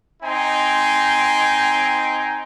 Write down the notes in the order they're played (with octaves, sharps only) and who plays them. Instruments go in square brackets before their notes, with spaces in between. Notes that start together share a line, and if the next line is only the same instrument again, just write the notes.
[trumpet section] C4 D#4 G5 G#5 C6